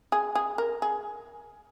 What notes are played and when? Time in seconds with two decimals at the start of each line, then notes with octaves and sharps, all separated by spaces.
0.12 G#4
0.35 G#4
0.58 A#4
0.82 G#4